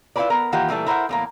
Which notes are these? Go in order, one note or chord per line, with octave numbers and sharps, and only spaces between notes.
E4 F4 G4 G#4 B4 D5
B3 A#4
D#3 E3 A#3 F4 G4 F#5
A#2 E3 G3 A3
E4 A#4 C5 D#5 E5 F#5
E2 A2 A#3